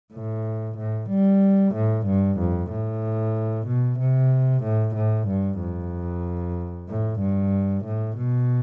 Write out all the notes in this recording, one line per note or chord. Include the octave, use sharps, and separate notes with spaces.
A2
A2
G3
A2
G2
F2
A2
B2
C3
A2
A2
G2
F2
A2
G2
A2
B2